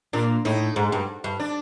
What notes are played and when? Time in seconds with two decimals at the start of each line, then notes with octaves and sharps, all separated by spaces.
0.13 A#2 D4
0.45 A2 D#4
0.76 G#2
0.92 G2
1.24 G2
1.39 D4